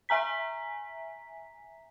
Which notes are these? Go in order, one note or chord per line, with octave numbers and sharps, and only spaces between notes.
E5 G#5 A#5 B6